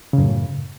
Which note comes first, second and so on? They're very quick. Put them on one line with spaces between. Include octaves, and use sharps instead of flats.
C#3 F#2 A2